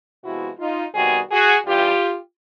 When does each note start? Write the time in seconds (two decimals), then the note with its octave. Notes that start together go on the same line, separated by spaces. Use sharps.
0.23 C3 F3 G#3 B3 E4 F#4
0.59 D#4 F4
0.94 C3 D#3 G3 B3 F#4 G#4
1.30 F#4 G#4
1.66 G2 E3 G3 F4 G4